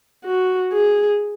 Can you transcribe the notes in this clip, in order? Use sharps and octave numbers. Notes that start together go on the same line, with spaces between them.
F#4
G#4